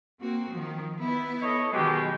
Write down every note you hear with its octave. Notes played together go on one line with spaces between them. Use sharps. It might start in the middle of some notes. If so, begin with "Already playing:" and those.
A#3 C4 F#4
D#3 F3
B3 E4 B4
A4 C#5 D#5
B2 D#3 F#3 G#3 G4